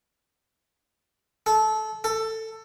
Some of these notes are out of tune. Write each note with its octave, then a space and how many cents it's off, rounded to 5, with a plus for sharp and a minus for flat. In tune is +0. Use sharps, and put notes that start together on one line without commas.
A4 -20
A4 +15